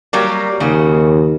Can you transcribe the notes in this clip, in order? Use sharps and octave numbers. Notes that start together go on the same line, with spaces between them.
F#3 G3 A#3
D#2 C#3 F#4